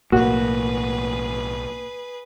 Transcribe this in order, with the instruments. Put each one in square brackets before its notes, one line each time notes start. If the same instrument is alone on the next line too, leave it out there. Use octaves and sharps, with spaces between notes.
[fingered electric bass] B1 A2 [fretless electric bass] A#3 [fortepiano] F#4 [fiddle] G#4 B4